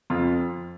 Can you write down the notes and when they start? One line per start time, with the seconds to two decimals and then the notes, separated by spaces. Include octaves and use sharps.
0.10 F2 F4